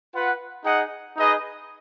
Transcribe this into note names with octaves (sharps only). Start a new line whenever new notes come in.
F4 B4 F#5
D#4 G#4 D#5 F#5
D#4 G#4 B4 D#5